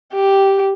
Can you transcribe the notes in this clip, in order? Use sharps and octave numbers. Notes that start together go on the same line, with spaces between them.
G4